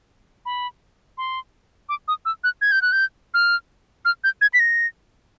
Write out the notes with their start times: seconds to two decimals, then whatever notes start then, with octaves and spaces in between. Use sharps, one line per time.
0.46 B5
1.18 C6
1.89 D6
2.08 D#6
2.25 E6
2.44 F#6
2.61 G#6
2.72 G6
2.82 F#6
2.92 G6
3.34 F6
4.05 F6
4.24 G6
4.41 G#6
4.54 B6
4.60 A#6